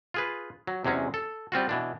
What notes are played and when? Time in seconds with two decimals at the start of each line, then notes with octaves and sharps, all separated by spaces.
0.14 F4 G#4 B4
0.67 F#3
0.85 E2 C3 F#3 G#3 C#4
1.14 A4
1.52 G3 C4 F4 F#4
1.69 B2 E3 D4